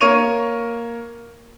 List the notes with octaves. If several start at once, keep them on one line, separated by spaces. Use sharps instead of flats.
A#3 A#4 C#5 C#6 D#7 F7